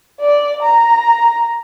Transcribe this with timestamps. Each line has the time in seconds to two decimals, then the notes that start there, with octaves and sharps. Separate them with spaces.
0.20 D5
0.62 A#5